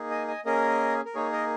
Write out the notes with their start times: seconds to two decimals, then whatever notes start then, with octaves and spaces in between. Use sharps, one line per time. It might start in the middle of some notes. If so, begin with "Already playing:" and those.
Already playing: A#3 D#4 G#4
0.10 D#5 G#5
0.28 D#5 G#5
0.45 A#3 C#4 G#4 A#4 D#5
1.05 A#4
1.15 A#3 D#4 G#4 C#5
1.32 A#4 D#5